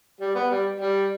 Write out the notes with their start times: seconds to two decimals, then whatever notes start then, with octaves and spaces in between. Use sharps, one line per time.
0.20 G3
0.35 B3
0.51 G3
0.80 G3